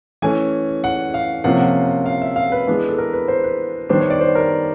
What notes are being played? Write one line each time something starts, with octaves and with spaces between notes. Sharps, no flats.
E3 A3 C#4 G#5
F#5
F5
C3 F3 A#3 C#4 F#5
F#5
F5
E5
F5
B4
E3 G#3 B3 D4
A4
A#4
B4
C5
B4
D#3 G3 B3 D4 C5
C#5
D5
C5
A#4